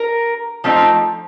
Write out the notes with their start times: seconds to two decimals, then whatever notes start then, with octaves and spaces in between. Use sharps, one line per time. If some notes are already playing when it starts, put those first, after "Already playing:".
Already playing: A#4
0.64 F3 A3 C4 D#4